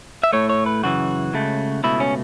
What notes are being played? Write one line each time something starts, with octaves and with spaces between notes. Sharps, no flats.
E5
A2 A3 C#5
C#5
B4
F#2 C#3 E3 F#4
C#2 C#3 A3
C#2 B2 A3 E4
C#4